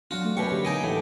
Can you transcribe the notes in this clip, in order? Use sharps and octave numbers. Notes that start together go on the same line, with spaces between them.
F#3 D4 F4 F#4
A3
F#2 B2 G4 B4 G5 C#6
D3 A#3 G4
D#4 G#4 D#5 D7
A2 E3 B3 G4 A5